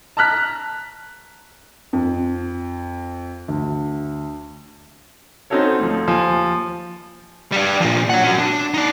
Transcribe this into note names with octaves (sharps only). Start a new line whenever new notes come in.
A5 A#5 F6 F#6 B6
F2
D2
C4 C#4 D#4 F#4 A4 C#5
D2 F3
D#2 F3 G#5
G3 D4
A#2 F3
C#5 F#5
C#4 F#4
D4
D#4 D5